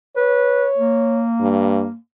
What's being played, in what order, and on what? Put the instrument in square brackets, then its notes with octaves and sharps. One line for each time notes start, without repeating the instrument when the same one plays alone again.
[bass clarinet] B4 [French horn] C#5
[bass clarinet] A#3
[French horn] G2